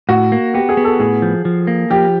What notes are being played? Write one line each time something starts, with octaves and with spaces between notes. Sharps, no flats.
A2 F#4
A#3
B3 G4
G#4
B3
A4
A2 G#4
F3
F3
A#3
F3 G4